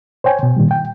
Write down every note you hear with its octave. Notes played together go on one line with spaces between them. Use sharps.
C5 C#5 G5 G#5
B2
A#2 D#3 G3
G5